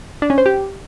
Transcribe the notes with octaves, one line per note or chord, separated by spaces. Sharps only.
D4
C#4
C5
G4